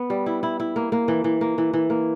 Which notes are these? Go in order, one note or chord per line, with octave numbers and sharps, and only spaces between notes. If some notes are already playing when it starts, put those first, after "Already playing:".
Already playing: B3
G3
E4
E4
E4
A#3
A#3
E3
E3
A#3
E3
E3
A#3